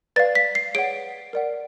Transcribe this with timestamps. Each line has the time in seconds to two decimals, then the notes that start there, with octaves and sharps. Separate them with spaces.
0.16 B4 D5 F5 A6
0.35 B6
0.55 C7
0.75 G#4 C#5 F#5 D7
1.33 A#4 D5 F#5